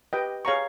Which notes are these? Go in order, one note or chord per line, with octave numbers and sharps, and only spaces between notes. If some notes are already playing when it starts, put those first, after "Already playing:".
G4 B4 D#5 G5
G#4 C#5 F5 A#5 C#6